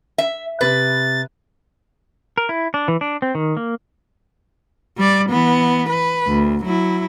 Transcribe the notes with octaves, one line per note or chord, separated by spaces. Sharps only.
E5
C3 B4 A6
A#4
E4
D4
E3
D4
C4
D#3
A#3
G3 D5
E3 B3
B4
D2
F#3 E4